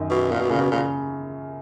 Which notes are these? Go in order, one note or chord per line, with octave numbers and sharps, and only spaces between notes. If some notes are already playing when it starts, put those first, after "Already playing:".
Already playing: F#2 D#3 D#4
F#2 B2
A#2 A#3
B2
A#2 C#3
B2
A#2 C#3